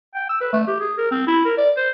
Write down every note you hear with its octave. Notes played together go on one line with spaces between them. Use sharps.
G5
E6
B4
A3
G4
G#4
A#4
C4
E4
A#4
D5
C5